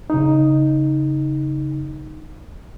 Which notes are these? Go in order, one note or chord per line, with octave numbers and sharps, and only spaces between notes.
C#3 D#4